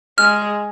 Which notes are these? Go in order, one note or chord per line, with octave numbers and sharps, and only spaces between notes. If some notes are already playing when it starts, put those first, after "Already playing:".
G#3 F6